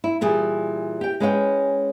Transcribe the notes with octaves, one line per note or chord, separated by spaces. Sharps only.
E4
A#2 E3 G3 G#4
G4 G5
G#3 C#4 B4 C#5 F5 G5